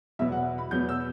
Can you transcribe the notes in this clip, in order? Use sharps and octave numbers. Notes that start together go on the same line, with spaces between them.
E2 B2 F#3 B3 E5
F#5
B5
E2 B2 F#3 B3 G6
E6